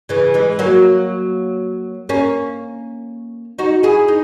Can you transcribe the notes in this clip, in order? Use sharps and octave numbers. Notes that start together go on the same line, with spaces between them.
C#3 E3
E3 G#3
F#3 A#3
A#3 C#4
D#4 F#4
E4 G#4
D#4